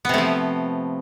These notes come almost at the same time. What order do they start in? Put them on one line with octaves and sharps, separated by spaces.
B3 C3 A3 F3